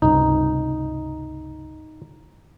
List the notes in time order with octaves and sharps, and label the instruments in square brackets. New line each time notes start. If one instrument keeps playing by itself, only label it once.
[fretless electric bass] C#2 G2 C3 [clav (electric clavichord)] D#4